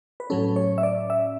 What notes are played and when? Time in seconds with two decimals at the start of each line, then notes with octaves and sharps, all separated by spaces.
0.20 B4
0.30 A2 F#3 C#4 A4
0.56 C#5
0.78 E5
0.83 D5
1.10 E5